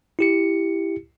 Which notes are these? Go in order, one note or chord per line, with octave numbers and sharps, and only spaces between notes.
E4 G4 C#7